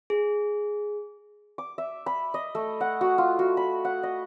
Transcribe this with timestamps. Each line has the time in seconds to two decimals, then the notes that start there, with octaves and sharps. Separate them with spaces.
0.10 G#4
1.58 D6
1.78 E5
2.06 B5
2.34 D#5
2.55 A3
2.81 F#5
3.01 F#4
3.18 F4
3.39 F#4
3.57 B5
3.85 F#5
4.03 D#5